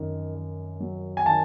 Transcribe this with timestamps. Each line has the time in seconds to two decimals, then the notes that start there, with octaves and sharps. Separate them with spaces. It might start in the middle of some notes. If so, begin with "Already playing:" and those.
Already playing: F#2 D#3
0.35 D#3
0.80 F#3
1.17 G#5
1.26 D#3 A5